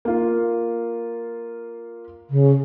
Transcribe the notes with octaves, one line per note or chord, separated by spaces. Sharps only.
A#3 F4
C#3